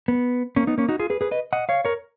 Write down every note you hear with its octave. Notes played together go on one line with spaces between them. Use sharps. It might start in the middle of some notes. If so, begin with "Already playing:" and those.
B3
A#3 C#4
B3 D#4
A#3 C#4
D#4 F#4
F4 G#4
G#4 B4
G#4 B4
B4 D#5
D#5 F#5
C#5 F5
A#4 C#5